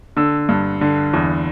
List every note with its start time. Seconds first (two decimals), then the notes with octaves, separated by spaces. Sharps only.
0.17 D3 E6
0.49 G2
0.81 D3
1.14 E2